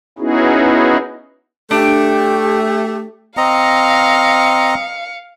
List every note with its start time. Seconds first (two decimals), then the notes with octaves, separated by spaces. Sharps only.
0.19 B3 C#4 D#4 E4 F#4 G#4
1.71 A3 D4 G4
3.37 C4 D#5 F5 A#5 C#7